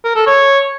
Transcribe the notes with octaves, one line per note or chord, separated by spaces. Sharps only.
A#4
A4
C#5